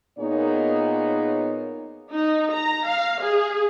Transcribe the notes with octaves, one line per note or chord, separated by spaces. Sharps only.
A#2 A#3 B3 D#4 G#4 C#5
D#4
A#5
F5
G#4